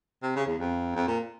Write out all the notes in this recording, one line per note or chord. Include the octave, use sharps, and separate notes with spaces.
C3
C#3
E2
F2
F2
A#2